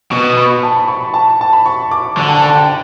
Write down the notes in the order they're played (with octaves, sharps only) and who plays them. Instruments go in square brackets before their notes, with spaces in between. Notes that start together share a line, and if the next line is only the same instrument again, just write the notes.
[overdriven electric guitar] B2 [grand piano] C#6
[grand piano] B5
A5
B5
C#6
B5
A5
A5
B5
C#6
D6
[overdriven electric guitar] D3 [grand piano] C#6
[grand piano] A5
A5
G5